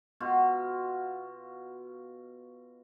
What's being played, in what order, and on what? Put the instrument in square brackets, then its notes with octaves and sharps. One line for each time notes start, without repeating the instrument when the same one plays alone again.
[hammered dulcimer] B2 F4 F#4